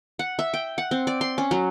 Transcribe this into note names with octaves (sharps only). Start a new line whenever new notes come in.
F#5
E5
G5
F#5
C4
D5
C6
C#4
F#3